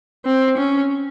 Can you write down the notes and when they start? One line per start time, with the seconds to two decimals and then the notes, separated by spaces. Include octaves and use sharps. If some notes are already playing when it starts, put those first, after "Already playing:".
0.26 C4
0.57 C#4